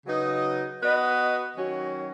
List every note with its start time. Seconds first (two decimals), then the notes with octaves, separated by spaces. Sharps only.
0.05 C#3 F#3 D#4 B4 D#5
0.81 B3 F#4 B4 D#5
1.55 D#3 F#3 C#4 F#4